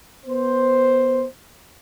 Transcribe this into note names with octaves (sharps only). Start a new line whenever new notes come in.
B3 C5